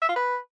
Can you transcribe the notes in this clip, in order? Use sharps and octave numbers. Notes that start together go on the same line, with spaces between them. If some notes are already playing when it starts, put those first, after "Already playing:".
E5
F4
B4